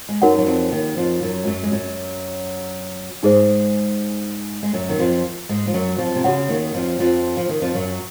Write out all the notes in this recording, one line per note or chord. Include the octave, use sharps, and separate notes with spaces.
G#3
F#2 F#3 D#4 F#4 A#4 C#5 F#5
F#3
F2 F3
D#2 D#3
F2 F3
F#2 F#3
G#3
F#2 F#3
G#3
F#2 F#3
G#2 G#3 D#4 G#4 C5
G#3
F#2 F#3
D#3
F2 F3
G#2 G#3
F3
F#2 F#3
F2 F3
C3
C#3 F#4 C#5 F#5
D#2 D#3
F2 F3
F2 F3
F3
D#3
F2 F3
F#2 F#3